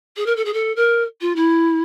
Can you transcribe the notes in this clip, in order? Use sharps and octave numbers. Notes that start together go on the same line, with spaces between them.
G#4
A#4
A4
G#4
A4
A#4
F4
E4